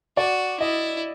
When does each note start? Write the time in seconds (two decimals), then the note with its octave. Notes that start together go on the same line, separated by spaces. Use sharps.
0.17 F#4 D5
0.60 E4 D#5